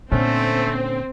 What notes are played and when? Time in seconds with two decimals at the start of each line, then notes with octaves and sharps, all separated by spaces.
0.12 A#2 D3 A3 C4 C#4